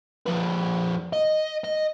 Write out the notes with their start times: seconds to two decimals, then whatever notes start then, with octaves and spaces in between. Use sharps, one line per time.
0.27 F2 B4
1.13 D#5
1.64 D#5